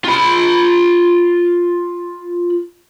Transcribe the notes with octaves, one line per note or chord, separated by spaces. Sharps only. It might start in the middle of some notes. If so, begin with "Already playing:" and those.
F4 B5